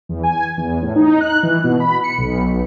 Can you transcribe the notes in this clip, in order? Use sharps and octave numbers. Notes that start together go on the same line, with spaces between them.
E2
G#5
E2
A2
D#4
F#6
E3
B2
B5
C#7
B1